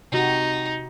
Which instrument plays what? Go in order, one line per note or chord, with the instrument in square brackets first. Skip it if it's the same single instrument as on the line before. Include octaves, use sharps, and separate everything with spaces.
[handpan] C3 F#4 G4 [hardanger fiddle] D#4